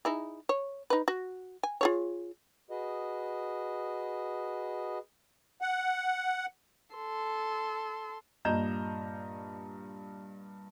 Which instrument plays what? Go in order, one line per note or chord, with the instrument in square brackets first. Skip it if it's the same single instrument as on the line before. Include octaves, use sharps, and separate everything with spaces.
[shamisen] D#4 E4 G#4
C#5
D#4 B4
F#4
G#5
F4 G#4 C#5
[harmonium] F#4 G#4 B4 D#5
[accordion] F#5
[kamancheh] A4 C6
[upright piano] G2 A#2 D#5 A#5 G6 E7